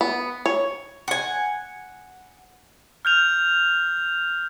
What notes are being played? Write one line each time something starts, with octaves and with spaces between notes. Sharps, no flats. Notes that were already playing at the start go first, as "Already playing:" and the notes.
B3
C#5
F#5 G#5
F6 G6 F7